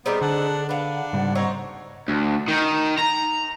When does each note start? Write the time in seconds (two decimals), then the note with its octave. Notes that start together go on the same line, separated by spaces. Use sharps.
0.06 G3 B3 C4 D#4 G#4 D5
0.21 D3 D4 F#5 A5
0.69 D4 B4 F5 F#5
1.13 G#2 C#3 G3
1.35 C4 D4 D#4 C#5 A#5 C#6
2.08 D2
2.48 D#3
2.99 A#5